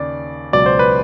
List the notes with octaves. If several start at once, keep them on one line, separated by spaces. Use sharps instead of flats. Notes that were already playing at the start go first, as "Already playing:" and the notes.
Already playing: D#2 C#3 D5
C#2 B2 F#3 D5
C5
B4